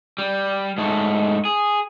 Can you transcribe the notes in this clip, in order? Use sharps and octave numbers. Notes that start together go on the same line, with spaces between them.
G3
G#2 A3
G#4